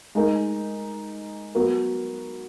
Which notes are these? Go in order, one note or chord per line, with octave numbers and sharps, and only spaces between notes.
G#3 D#4 A#4
F#3 B3 F#4 A#4